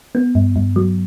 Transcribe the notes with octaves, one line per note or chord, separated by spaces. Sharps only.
B3
G2
G2
F#3